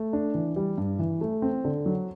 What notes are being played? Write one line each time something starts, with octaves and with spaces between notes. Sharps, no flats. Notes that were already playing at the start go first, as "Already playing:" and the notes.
Already playing: A3
D4
E3
G3
G2
E3
A3
C4
D3
F#3